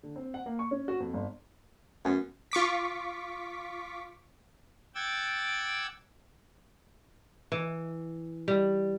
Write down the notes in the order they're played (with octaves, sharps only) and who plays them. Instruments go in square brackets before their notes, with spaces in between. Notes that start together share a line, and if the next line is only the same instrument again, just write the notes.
[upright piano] D3
C4
F#5
A#3
C#6
C#4
F#4
F2
G1
[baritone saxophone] F#2 [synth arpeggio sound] A3 B3 C#4
[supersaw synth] F4 C#6 D6 B6
[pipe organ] F#5 G5 D6 E6 G#6 A6
[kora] E3
G3